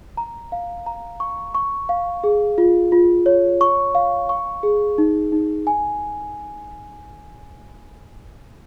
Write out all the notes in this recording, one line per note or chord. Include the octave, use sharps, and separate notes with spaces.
A#5
F5
A#5
C#6
C#6
F5
G#4
F4
F4
C#5
C#6
F5
C#6
G#4
D#4
D#4
G#5